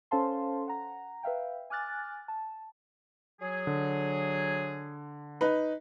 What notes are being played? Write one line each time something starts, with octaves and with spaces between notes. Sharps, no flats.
C#4 A4 C5 F5 A5 C6
F#5 A#5
B4 E5 F5 G5
G#5 D6 F6 F#6 A6
A5
F#3 G#4
D3
D#4 B4